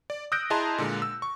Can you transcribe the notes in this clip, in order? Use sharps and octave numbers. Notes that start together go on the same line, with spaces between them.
D5
D#6 E6 F#6 G6 A#6 D7
E4 G#4 D#5 A5 A#5 C6
A#2 D3 G#3
E6
C#6